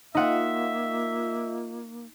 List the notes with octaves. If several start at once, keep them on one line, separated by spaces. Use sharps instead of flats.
A#3 D#4 F4 D#5 E5 F#5